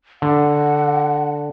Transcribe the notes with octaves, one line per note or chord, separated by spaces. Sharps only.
D3 F#5